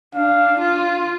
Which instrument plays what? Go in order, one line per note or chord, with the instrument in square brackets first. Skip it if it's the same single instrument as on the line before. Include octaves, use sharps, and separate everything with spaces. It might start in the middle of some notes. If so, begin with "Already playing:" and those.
[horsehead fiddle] D4 [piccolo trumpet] F5
[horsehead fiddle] F4